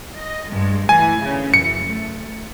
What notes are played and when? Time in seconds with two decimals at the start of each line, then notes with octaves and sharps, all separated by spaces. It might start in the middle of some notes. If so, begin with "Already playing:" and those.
0.17 D#5
0.50 G2 G#3
0.89 E3 A3 G#5
1.22 D2 C#3
1.54 F#2 E3 C#7
1.86 A3